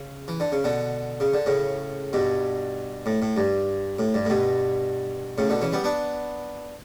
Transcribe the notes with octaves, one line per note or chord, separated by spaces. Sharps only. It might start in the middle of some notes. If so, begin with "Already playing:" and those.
Already playing: C#3
E3
D3
C#3
B2 D3
C#3
D3
A2 C#3
G2 B2
A2
A2
G2
A2
G2
A2
G2 B2
A2 C#3
B2 D3
C#3 E3
G3 B3
B3 D4